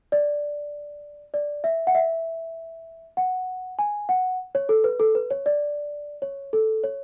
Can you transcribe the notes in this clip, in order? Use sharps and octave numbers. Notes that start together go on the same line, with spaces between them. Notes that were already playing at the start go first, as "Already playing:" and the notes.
D5
D5
E5
F#5
E5
F#5
G#5
F#5
C#5
A4
B4
A4
B4
C#5
D5
C#5
A4
C#5